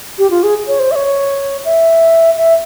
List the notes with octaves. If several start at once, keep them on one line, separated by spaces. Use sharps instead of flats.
G4
F4
G#4
C#5
C5
E5
C#5
E5
E5